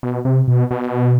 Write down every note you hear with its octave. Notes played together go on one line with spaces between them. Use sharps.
B2
C3
B2
B2